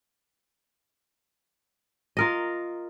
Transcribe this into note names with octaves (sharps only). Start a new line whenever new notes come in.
F4 A#4 D#5